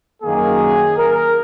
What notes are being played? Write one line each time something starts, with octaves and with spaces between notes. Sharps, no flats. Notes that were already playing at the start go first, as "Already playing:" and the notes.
F#2 D#3 A#3 G#4
A#4